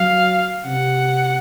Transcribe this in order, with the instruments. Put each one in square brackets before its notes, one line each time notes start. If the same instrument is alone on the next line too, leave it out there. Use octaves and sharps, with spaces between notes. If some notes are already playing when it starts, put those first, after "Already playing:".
Already playing: [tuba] F#3 [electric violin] F5
[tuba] C3 [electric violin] F#5